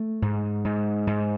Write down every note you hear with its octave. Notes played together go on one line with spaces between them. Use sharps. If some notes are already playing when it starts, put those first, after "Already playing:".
Already playing: A3
G#2
G#2
G#2